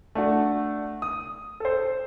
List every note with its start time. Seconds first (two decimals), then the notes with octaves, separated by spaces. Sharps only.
0.15 A3 D4 F#4
1.02 D#6
1.60 A4 C5